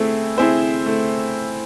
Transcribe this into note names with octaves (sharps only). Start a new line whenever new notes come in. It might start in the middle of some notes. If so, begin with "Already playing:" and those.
Already playing: A3 C4 E4 G#4
C4 E4 G#4 C5
A3